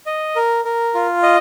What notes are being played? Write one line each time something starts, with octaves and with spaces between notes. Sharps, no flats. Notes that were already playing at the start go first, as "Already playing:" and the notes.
D#5
A#4
A#4
F4
D#5